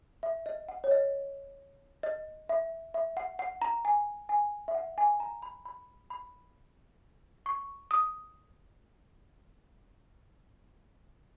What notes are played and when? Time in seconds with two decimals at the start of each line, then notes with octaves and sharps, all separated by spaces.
0.23 E5
0.46 D#5
0.69 F#5
0.84 C#5
0.91 D#5
2.03 D#5
2.49 E5
2.94 E5
3.17 F#5
3.39 F#5
3.62 A#5
3.85 G#5
4.29 G#5
4.68 E5
4.75 F#5
4.98 G#5
5.20 A#5
5.42 B5
5.65 B5
6.10 B5
7.46 C#6
7.91 D#6